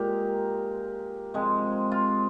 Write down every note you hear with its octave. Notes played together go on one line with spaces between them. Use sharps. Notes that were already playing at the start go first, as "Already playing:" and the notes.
Already playing: A#2 G#3 G4 A#4
C3 F3 G#3
F4